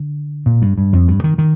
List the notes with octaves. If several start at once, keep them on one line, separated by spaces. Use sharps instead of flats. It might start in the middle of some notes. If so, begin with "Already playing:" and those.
Already playing: D3
A#2
G2
G2
F2
G2
D#3
D#3